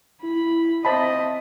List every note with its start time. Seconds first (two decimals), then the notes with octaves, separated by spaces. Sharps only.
0.23 E4 B5
0.85 C4 C5 D#5 E5 A5 B5